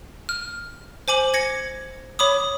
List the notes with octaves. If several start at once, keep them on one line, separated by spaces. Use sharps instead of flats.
F6
C5 G#5 D6 F#7
G#6 A#6 C#7
C#5 B5 D6 D#6